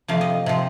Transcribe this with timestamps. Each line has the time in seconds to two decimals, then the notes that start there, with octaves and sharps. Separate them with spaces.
0.08 F2 C3 F3 F5
0.21 D#5
0.46 C3 F3